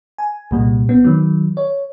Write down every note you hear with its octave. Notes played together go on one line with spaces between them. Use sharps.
G#5
C2 A#2 G3
B3
D#3 F#3
C#5